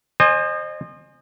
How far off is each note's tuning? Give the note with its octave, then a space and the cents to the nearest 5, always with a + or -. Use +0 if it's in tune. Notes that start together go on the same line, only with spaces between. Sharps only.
C5 +25 D#5 -30 G#5 +0